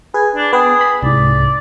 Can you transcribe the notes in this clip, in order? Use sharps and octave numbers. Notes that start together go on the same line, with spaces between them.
G#4 B4 G#5
D4
B3 G#4 B4 G5
B5
C2 G#2 D5